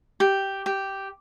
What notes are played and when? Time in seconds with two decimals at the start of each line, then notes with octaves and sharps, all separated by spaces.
0.20 G4
0.66 G4